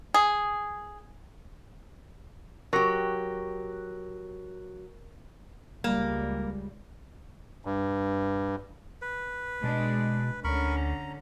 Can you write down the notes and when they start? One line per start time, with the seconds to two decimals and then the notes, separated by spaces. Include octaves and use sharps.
0.14 G#4
2.73 F#3 G4 A#4 C#6 A#6
5.84 C#2 G3 G#3 A#3
7.65 G2
9.02 B4
9.63 B2 G#3 D4
10.44 D2 D3 C#4 A#4 B5 C#6
10.76 A#5